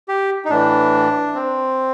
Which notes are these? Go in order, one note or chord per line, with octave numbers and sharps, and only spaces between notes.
G4
D#4
A2 E3 D4
C4